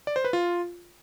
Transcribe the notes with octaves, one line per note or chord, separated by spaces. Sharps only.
D5
C5
B4
F4